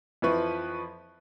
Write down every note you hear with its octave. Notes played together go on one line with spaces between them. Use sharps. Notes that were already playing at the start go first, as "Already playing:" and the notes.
F2 E3 F3 E4 B4 C#6